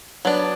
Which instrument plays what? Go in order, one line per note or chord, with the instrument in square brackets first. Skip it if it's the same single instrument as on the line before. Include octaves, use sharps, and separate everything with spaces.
[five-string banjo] F#3 B3 D4